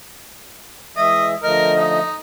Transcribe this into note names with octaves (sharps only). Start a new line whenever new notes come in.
E3 G#3 D#5 E5
D3 F3 A3 A#4 D#5
D#4